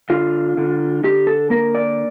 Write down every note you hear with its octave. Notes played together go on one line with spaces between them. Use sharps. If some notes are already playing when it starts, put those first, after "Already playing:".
D3 F4
D3
D3 G4
A4
A#3 A#4
D5